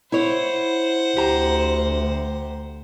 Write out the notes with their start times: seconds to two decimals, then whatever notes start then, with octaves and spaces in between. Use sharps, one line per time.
0.12 E4 C5 C#5 F#5
1.17 D2 G4 A#5